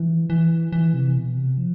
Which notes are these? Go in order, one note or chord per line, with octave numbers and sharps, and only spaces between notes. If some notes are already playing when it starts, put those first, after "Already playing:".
Already playing: E3
E3
E3
C3
B2
C3
F3